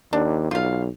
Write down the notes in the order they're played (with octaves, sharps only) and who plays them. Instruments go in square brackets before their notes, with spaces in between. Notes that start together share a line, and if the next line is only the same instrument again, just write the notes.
[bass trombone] D#2 [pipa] D4
[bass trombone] B1 [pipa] F4 F5